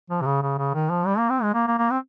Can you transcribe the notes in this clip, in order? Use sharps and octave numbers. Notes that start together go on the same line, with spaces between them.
F3
C3
C#3
C#3
C#3
D#3
F3
G3
A#3
C4
G#3
A#3
A#3
A#3
C4